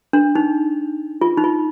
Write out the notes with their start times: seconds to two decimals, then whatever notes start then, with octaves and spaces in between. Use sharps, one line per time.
0.13 D4
0.35 D#4
1.21 F4
1.38 D#4
1.44 F4